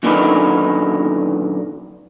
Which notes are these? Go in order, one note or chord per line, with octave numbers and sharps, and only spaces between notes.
F#2 A#2 D3 D#3 D#4 B4